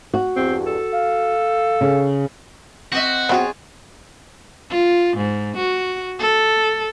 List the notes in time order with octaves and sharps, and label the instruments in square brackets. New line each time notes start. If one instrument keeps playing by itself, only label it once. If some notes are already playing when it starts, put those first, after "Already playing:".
[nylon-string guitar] F#4
[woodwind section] E2 G2 [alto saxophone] C4
[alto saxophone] A4
[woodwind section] F5
[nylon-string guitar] C#3
[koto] C4 D#5 E5 [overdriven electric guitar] F#4
[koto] F#3 F4 G#4 [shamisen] B3 C4 F#4
[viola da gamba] F4
G#2
F#4
A4